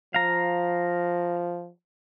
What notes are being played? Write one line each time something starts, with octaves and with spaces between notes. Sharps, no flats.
F3 F5 A#5